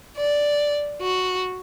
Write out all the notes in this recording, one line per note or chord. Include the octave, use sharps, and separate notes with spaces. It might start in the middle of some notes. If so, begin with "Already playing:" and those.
D5
F#4